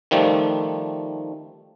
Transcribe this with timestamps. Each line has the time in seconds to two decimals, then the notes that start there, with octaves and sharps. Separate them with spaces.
0.11 D#3 F3 G3 A3